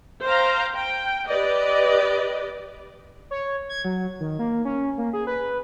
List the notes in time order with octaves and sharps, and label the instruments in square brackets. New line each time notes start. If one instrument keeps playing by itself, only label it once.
[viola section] C5 F5 G5 A#5
G5
G4 B4 D5 D#5
[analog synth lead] C#5
G#6
F#3
D#3
A#3
C#4
A#3
G#4
B4